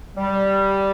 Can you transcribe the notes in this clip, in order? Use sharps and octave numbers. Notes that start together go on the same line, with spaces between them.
G3